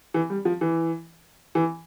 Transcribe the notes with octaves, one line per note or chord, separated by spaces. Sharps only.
E3
G3
F3
E3
E3